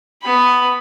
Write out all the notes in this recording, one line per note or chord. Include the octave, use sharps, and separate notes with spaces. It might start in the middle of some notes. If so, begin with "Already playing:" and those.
B3 B5